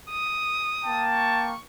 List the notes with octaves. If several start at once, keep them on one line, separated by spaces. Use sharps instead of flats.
D#6
A#3 G5 A5
C#6